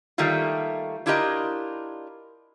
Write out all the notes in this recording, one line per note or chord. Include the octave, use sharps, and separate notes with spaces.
D#3 G3 A3 A#3 F4
D4 E4 F4 G4 A#4 D#5